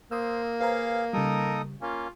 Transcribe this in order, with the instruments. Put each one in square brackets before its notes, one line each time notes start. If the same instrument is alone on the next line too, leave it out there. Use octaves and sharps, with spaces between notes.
[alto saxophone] A#3 [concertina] C5 [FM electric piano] D#6 E6
[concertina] G#4 [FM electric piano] B4 C5 A#5 [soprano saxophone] F5
[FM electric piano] C#3 G3 [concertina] D#4 A4 D#6 [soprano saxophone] A#4
[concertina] A#3 C#4 [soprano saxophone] F4